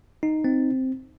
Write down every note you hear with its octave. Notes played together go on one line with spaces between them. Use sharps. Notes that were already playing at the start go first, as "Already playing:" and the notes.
D#4
C4